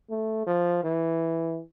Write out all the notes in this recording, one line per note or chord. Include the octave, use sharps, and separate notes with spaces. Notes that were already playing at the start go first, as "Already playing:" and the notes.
A3
F3
E3